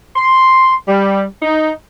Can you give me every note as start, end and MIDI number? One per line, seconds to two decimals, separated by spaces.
0.16 0.74 84
0.88 1.24 55
1.42 1.71 63